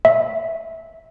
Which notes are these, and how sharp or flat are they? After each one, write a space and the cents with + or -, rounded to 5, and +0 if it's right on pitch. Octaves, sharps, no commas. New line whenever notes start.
E5 -15